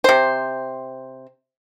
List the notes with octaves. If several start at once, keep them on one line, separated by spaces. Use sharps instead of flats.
C3 C5